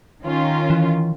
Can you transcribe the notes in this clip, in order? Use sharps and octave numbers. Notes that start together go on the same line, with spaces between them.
D#3 C#4 F4
E3